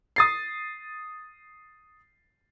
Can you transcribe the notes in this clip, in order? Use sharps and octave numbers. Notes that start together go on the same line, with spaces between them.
D#6 A6 C7